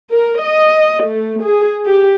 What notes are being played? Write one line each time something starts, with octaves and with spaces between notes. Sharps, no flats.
A#4
D#5
A3
G#4
G4